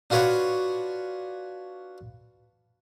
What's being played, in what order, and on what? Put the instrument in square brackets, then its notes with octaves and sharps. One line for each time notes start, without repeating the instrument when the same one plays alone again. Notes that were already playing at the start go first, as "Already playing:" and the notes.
[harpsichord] D4 F4 F#4 B4 C#5 F5